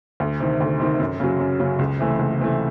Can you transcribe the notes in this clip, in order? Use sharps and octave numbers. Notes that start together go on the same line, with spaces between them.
D2
C3 D#3
D2
C3 D#3
F#2
C#3 F#3
F#2
C#3 F#3
C#2
C3 E3 A3
C#2
C3 E3 A3